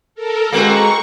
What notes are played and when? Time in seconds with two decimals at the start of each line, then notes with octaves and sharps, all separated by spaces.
0.15 A4 A#4
0.52 G#3 A#3 C4 F#4 B4 C#6